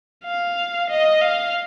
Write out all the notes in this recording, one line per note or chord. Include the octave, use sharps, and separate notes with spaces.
F5
D#5
F5